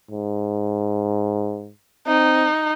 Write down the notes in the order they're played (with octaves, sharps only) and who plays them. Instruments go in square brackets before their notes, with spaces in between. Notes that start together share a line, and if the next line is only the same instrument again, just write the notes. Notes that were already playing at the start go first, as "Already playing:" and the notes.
[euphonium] G#2
[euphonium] C4 [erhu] D#4